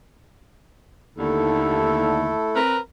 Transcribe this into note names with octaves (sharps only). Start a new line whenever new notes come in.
D#2 D3 A3 E4 A4
C4 A#4 B4